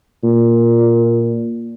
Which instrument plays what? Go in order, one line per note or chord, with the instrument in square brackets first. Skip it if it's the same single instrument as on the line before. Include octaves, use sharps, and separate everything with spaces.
[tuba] A#2